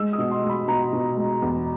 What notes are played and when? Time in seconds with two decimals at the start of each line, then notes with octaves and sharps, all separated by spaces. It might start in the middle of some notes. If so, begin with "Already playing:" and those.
Already playing: G#3 E6
0.13 D#6
0.18 B2
0.31 C6
0.44 G#3
0.49 B5
0.68 B2 A#5
0.93 B2
1.17 G#3
1.42 E2